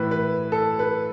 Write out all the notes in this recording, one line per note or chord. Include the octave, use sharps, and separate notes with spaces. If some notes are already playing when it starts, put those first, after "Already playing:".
Already playing: A2 E3 B4
B4
A4
B4